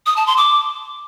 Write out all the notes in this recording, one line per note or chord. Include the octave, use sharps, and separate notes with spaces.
D#6
A5
C6
D6